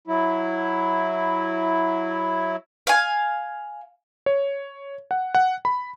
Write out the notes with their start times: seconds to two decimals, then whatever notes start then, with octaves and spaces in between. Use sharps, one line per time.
0.08 F#3 E4
2.87 F5 G#5
4.26 C#5
5.11 F#5
5.35 F#5
5.65 B5